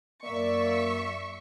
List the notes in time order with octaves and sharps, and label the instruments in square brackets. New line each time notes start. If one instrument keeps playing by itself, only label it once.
[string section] F#2 E5 C#6 [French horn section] A#3 D5